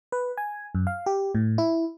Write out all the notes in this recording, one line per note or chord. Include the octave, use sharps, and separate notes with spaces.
B4
G#5
F#2
F5
G4
A2
E4